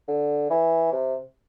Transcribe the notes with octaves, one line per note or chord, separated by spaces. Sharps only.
D3
E3
C3